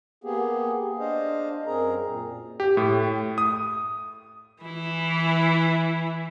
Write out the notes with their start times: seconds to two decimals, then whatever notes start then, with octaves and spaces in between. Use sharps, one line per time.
0.24 A#3 B3 G4 G#4
1.00 D4 C5 D#5 F5
1.66 F#2 C4 G#4 A#4 A#5
2.06 A#2
2.60 G4
2.77 A2
3.38 D#6
4.63 E3 E4